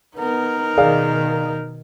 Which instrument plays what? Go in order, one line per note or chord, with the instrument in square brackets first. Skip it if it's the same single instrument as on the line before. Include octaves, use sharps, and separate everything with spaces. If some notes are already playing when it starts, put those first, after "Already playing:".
[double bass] B3 [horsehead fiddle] D#4 A#4
[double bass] B2 D#3 [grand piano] G#4 D5 F5